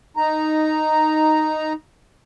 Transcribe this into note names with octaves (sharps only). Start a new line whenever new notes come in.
D#4 A#5